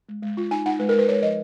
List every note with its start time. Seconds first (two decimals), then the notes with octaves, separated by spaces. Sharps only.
0.09 G#3
0.22 G#3
0.37 F4
0.51 D#4 G#5
0.66 D#4 F#5
0.80 G#3 B4
0.89 A#4
0.94 G#3 B4
1.09 G#3 C#5
1.22 F3 D#5